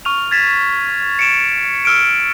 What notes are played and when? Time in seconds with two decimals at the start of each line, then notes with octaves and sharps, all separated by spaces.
0.05 C#6 F6 F7
0.31 G#6 A6 B6 E7
1.19 C#7 D7 E7
1.85 E6 F6 D7